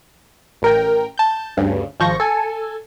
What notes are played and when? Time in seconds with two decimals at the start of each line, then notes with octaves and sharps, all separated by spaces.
0.62 A1 A#4 G5
1.18 A5 G6
1.57 D2 G2 C#3
2.00 G#1 F3 C#6 G6 A#6
2.20 A4 G#5